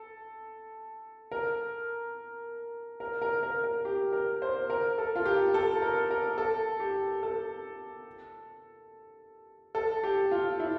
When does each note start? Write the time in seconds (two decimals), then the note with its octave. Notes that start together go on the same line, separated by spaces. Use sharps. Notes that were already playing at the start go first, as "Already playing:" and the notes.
Already playing: A4
1.32 A#4
3.00 A#4
3.22 A#4
3.43 A#4
3.64 A#4
3.85 G4
4.13 A#4
4.42 C5
4.70 A#4
4.98 A4
5.15 F4
5.26 G4
5.54 A4
5.82 A#4
6.10 A#4
6.38 A4
6.80 G4
7.23 A4
9.75 A4
10.04 G4
10.31 F4
10.60 E4